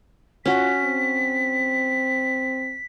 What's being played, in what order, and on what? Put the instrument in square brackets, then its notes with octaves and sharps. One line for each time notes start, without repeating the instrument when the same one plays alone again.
[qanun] C#4 F#4 [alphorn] F4 [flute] B6
[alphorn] C4